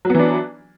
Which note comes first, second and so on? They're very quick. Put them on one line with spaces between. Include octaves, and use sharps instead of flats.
F#3 B3 E3 D4